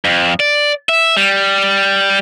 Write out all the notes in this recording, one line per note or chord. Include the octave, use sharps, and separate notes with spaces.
F2
D5
E5
G3